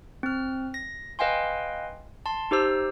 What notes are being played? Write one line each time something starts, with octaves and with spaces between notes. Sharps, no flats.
C4 F6
A#6
B4 D#5 F5 G5 G#5 C6
A5 C6
D#4 G4 C5 E6